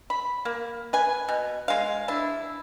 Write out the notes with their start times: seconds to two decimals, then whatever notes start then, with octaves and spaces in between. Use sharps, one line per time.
0.10 B5
0.45 A#3
0.93 B4 G#5
1.28 B2
1.68 G#3 F5
2.08 D4 E4